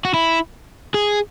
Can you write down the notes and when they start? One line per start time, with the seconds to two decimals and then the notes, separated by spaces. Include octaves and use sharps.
0.05 F#4
0.14 E4
0.94 G#4